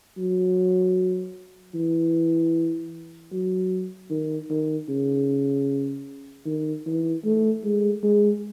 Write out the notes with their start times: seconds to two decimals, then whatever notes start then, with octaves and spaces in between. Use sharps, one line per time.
0.17 F#3
1.74 E3
3.32 F#3
4.10 D#3
4.50 D#3
4.89 C#3
6.46 D#3
6.86 E3
7.25 A3
7.64 G#3
8.03 G#3